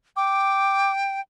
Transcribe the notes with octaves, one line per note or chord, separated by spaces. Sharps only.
G5 D6